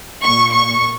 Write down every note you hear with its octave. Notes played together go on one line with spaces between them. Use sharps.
A#2 C#6
C#6